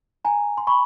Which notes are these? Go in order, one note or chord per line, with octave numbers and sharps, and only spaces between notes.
G#5 A#5
C6
B5 C#6